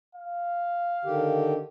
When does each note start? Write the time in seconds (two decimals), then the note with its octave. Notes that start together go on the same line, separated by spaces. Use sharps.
0.15 F5
1.05 D3 D#3 G4